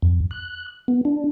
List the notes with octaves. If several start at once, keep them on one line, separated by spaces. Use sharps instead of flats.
F2
F#6
B3
D4